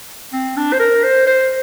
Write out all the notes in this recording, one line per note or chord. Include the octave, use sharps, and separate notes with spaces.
C4
D4
C5
A#4
C5
C5